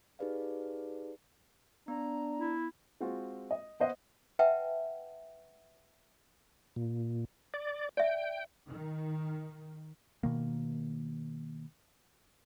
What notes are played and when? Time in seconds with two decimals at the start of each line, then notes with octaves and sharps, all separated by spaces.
0.19 D#4 G4 G#4 B4 D5 F5
1.88 B3 D4 A#5
2.38 E4
3.00 G#3 C4 F4 F#4 G#4
3.51 D#5
3.80 B3 C5 D#5 F#5
4.39 B4 E5 F#5 G5 A5
6.76 A#2
7.54 D5
7.97 D5 E5 G5
8.69 D#3
10.23 B2 D#3 A#3